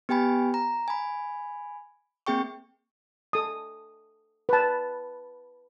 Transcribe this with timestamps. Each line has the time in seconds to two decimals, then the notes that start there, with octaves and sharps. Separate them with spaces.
0.09 B3 G4 G5 G#5 B5
0.54 A#5
0.88 G#5 B5
2.26 A#3 C4 G#4 G5 C#6
3.33 A4 D#6
4.49 B4 A5